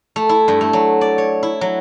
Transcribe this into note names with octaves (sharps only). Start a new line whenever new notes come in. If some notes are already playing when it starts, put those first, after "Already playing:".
A3
E4
G2
A3
F#3
D5
C#5
E4
F#3